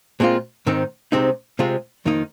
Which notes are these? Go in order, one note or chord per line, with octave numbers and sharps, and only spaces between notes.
A#2 G#3 C4 F4
G#2 D#3 C4 D#4
C2 C3 G#3 C4 D#4
C3 G#3 C4 F4
F2 D#3 A#3 D#4